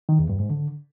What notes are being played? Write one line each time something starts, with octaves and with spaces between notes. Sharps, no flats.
D#3
E2
G2
G#2
D3